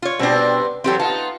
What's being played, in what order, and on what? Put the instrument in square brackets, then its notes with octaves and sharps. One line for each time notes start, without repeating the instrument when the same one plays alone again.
[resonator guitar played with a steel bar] F4 C#5
[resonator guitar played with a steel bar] B2 D4 [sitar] G3 B3 C4
[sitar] E3 F#3 [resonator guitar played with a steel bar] C4 G4 A4
[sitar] B3 D#4 F4 [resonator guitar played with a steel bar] A5